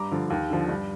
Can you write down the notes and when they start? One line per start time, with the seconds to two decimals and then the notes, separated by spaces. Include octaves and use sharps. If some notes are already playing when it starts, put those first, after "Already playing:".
Already playing: G2 A#5 D6
0.11 D3 F3
0.30 D#2
0.50 D3 F3
0.69 G2